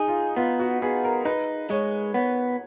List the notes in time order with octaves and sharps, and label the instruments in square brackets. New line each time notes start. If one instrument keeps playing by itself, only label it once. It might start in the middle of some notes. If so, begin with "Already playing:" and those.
Already playing: [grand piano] D#4 [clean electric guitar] G#4
[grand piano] F4
[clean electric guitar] B3 [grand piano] F4
[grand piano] F#4
[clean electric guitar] B3 [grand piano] G#4
[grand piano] A#4
[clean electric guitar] D#4 [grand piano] B4
[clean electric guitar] G#3 [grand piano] C#5
[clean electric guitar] B3 [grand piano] C#5